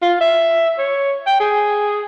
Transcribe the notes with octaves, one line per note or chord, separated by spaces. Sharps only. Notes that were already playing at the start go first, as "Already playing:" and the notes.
F4
E5
C#5
G5
G#4